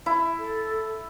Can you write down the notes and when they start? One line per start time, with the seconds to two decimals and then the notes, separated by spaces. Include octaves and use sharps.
0.06 E4 E5
0.38 A4